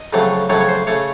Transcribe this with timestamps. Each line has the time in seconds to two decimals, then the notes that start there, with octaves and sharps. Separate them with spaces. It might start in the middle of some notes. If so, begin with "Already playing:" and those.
Already playing: D#5
0.13 F2 C#3 F#3 A3
0.49 F2 C#3 F#3 A3 C#5
0.60 C#5
0.69 C5
0.87 C#3 A3 C#5